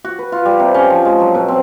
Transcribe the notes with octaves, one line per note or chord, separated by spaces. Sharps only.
F#4
B4
F4
G3
C3
C#4
F3
G#3
F#3
B2
C4